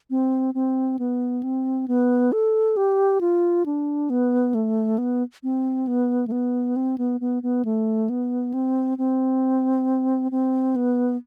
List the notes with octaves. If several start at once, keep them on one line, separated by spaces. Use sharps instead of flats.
C4
C4
B3
C4
B3
A4
G4
F4
D4
B3
A3
B3
C4
B3
A3
B3
C4
B3
B3
B3
A3
B3
C4
C4
C4
B3